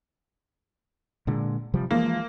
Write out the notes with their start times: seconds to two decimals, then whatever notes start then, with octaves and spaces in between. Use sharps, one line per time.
1.27 A#2 D3 G#3
1.74 C3 F3 G3
1.91 E3 F3 G#3 A#3